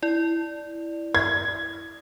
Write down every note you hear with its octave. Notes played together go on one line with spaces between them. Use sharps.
E4 D5
G#6